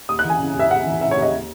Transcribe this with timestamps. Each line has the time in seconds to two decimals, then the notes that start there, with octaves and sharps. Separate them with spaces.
0.09 D#2 D#6
0.19 F#6
0.25 E3
0.30 G#5
0.40 C#3
0.55 D#2 E5
0.70 D#2 F#5
0.87 E3
1.01 C#3 E5
1.11 C#5
1.17 D#2
1.22 D#5